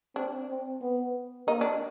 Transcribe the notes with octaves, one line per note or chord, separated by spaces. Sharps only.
C4 D4
C4
B3
A#3 D#4
D4